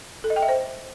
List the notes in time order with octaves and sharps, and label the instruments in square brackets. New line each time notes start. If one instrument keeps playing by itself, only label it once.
[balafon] A4
D#5
G5
E5
C5